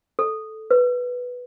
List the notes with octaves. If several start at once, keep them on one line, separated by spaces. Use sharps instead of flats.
A4
B4